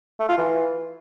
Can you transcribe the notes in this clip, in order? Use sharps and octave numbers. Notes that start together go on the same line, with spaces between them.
A3
F4
E3